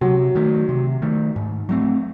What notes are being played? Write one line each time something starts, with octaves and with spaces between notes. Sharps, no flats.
C3 F#3
D#3 A3
C3
D#3 A3
G#2
F#3 A3 C4